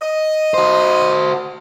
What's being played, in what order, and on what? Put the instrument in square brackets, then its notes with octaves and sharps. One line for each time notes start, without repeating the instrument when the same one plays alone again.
[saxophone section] D#5
[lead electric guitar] F#4 C5